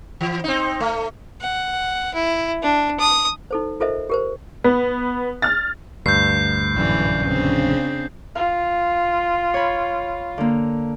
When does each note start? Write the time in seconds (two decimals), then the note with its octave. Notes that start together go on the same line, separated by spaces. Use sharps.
0.21 E3
0.44 C4 D#4
0.80 A3
1.41 F#5
2.14 E4
2.63 D4
2.99 D#6
3.51 D#4 A4 C5
3.80 F4 A4 A#4 C5 D#5 E5
4.09 G4 A#4 C5
4.64 B3
5.42 F6 A6
6.06 D2 G2 G6 C7
6.76 A#1 F#2 A2 D3 E3 D5
7.25 C#3 C4 D4
8.35 F4 F5
9.54 C#5 B5
10.38 D3 A#3